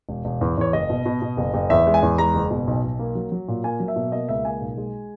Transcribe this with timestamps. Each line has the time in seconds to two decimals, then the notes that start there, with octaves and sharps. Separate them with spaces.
0.09 E1
0.25 E1
0.41 E2
0.57 E2 C#5
0.73 F#1 D#5
0.90 B2
1.06 B2
1.22 B2
1.37 F#1
1.54 F#1
1.70 E2 E5
1.87 G#3
1.94 G#5
2.02 E2
2.18 G#3 A#5
2.35 F#1
2.51 B2
2.67 B1
2.84 B1
2.99 A#3
3.15 F#3
3.32 F#3
3.48 A#2
3.64 A#3 G#5
3.80 F#3
3.88 E5
3.96 B2
4.12 A#3 D#5
4.29 C#2 E5
4.45 A#3 G#5
4.61 B1
4.77 G#3